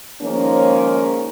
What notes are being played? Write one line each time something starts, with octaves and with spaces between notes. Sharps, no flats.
D#3 F3 G#3 A#3 C#4